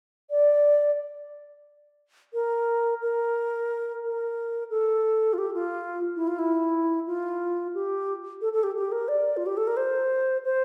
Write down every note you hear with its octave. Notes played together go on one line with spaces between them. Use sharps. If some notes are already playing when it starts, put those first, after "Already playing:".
D5
A#4
A#4
A#4
A4
F4
G4
F4
E4
F4
E4
F4
G4
A4
A4
G4
G4
A#4
D5
F4
G4
A4
A#4
C5
C5